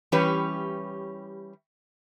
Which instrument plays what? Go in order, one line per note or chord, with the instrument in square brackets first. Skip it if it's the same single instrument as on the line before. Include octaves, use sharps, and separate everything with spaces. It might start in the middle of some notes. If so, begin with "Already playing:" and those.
[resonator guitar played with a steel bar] E3 G3 C#4 G4 B4 C#5